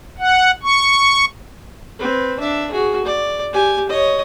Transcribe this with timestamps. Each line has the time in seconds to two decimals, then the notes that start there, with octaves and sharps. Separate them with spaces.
0.18 F#5
0.63 C#6
1.99 C4 B4
2.40 D4 E5
2.71 F#4 G#4
3.05 D5
3.53 G4 G#5
3.90 C#5 D#5